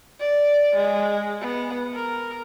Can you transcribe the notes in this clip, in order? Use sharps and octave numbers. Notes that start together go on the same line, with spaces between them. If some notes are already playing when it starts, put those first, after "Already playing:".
D5
G#3
B3
A#4